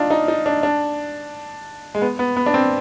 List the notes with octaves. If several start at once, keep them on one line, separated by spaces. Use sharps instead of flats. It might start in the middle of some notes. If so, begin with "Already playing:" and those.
Already playing: D4 D#4 F4
D#4
D#4
D4
D4
G#3
B3
B3
B3
D4
C4